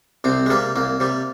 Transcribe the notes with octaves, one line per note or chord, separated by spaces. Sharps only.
C2 C3 C4
G#3
C3 G3 A#3
C2 A#3
C3 G3